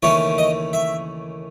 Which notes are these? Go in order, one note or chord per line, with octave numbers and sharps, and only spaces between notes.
D#2 C#3 E3 A3 C#4 C#5
D#5
E5